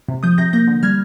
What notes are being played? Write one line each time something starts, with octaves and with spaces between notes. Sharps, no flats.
C3
F3 D#6 G6
C3 G6 A#6
A#3 G6 A#6
D3
G3 F6 G#6